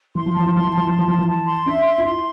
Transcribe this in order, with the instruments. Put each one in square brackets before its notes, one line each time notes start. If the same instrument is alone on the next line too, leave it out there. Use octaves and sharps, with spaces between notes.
[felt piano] E3 [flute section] C6
[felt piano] F3
[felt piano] E3 [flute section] A5
[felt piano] F3
[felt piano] E3 [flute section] C6
[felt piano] F3
[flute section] A5
[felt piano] E3
[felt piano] F3 [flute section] C6
[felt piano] E3
[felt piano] F3 [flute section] A5
[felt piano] E3
[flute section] A5
C6
[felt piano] D4 [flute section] E5
[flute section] C6
[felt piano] F4
[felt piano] E4 [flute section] C6